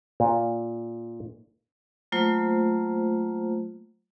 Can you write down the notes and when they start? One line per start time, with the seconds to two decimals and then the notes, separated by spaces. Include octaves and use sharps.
0.20 A#2
2.12 F#3 A3 A#3 F4 C5